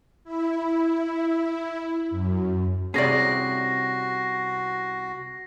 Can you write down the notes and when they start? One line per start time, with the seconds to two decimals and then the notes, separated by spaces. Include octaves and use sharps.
0.24 E4
2.10 F#2
2.94 C2 C3 C#4 F#4 G#4 D5 A#6 C7